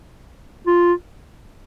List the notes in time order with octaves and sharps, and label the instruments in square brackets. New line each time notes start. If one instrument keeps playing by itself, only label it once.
[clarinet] F4